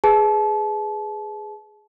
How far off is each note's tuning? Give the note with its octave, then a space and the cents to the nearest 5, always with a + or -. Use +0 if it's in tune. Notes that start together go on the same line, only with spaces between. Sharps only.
G#4 +0 B4 +10 A5 -30